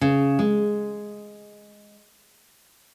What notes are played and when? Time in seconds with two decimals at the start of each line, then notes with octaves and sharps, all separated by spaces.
0.01 C#3
0.39 G#3